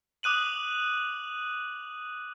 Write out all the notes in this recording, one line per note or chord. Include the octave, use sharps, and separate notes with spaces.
D6 D#6 F#6 D#7 F#7